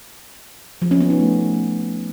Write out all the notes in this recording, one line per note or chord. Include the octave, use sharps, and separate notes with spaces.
F3
C#4
B3
D#4
A3